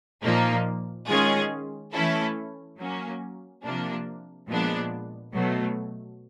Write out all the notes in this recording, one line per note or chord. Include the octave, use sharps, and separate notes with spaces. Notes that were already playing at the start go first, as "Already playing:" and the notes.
A#2 F3 A#3 D#4
D#3 G#3 C#4 F4 G#4
E3 A3 C#4 E4 A4
F#3 A#3 C#4
C3 F3 A#3 D4
A#2 F3 G#3 B3 D4
B2 F#3 A3